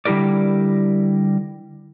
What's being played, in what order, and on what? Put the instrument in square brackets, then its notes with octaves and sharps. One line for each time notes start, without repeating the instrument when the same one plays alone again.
[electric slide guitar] D3 G3 E4 G4 A#4 D5